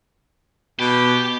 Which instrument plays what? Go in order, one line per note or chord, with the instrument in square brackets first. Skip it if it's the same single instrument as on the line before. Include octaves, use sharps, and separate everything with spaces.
[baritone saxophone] B2 [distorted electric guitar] G4